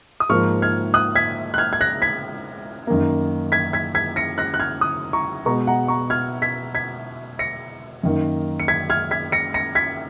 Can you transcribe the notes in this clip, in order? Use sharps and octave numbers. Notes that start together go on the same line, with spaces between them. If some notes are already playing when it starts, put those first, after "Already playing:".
D#6
G#2 F3 A#3 C#6 F6
F6 G#6
D#6 F#6
G#6 B6
F#6
F6 G#6
G#6
F#6 A#6
G#6 B6
F#2 D#3 A#3
G#6 B6
G#6 B6
G#6 B6
A#6 C#7
F#6 A#6
F#6
F6 G#6
D#6 F#6
A#5 C#6
B2 G#3 B3 A#5 C#6
F#5 A#5
A#5 C#6
F6 G#6
G#6 B6
G#6 B6
A#6 C#7
F#2 D#3 A#3
C#7
G#6 B6
F6 G#6
G#6 B6
A#6 C#7
A#6 C#7
G#6 B6